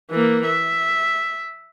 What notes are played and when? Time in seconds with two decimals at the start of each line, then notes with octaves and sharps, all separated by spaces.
0.11 E3 A#3
0.47 E5